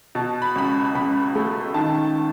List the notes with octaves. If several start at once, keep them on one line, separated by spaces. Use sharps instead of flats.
B2 A5
B5
C#2 B5
C#2 B5
A3
D#3 A5